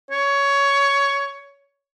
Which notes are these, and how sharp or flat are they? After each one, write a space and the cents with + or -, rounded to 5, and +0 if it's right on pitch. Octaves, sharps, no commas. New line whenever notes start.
C#5 +15